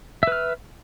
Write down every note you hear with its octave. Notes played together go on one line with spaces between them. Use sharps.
B4 E5 F6